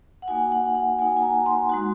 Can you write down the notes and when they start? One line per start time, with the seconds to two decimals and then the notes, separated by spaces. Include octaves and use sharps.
0.22 F#5
0.28 A#3 D#4 F#4 G#5
0.52 F#5
0.75 F#5
0.99 A#3 D#4 F#4 G#5
1.17 G#5
1.22 A#5
1.46 C6
1.69 G#3 D#4 F#4 C6